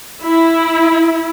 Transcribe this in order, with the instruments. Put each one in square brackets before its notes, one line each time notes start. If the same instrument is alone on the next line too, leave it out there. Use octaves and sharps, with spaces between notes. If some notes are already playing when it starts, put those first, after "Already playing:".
[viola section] E4